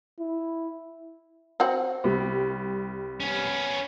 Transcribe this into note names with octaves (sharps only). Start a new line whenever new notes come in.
E4
C4 F#4 F#5
C2 G3
B3 C#4